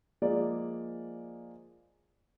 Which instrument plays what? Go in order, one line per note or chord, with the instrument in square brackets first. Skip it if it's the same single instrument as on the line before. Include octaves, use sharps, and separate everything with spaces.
[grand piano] F3 G#3 A#3 G#4 D5